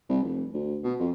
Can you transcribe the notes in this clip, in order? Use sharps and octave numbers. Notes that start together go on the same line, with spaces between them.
C2
F1
D2
B2
F2